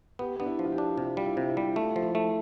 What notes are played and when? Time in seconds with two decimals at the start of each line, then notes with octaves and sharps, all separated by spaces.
0.19 B3 G4
0.40 B3 D4
0.46 E4
0.59 F3
0.65 F4
0.72 G4
0.78 D4
0.97 C3 F4
1.17 G3 F4
1.25 E4
1.37 C3
1.50 E4
1.57 G3
1.76 A3 F4
1.96 F3
2.02 E4
2.15 A3